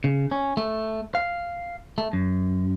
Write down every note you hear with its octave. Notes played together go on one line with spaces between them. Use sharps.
C#3
C#4
A3
F5
A3
F#2